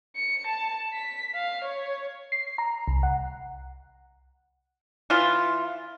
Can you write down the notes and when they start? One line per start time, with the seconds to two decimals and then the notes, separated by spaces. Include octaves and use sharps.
0.16 C#7
0.47 A5
0.93 B6
1.35 F5
1.64 C#5
2.32 C7
2.58 A#5
2.88 C2
3.03 F#5
5.10 E3 F4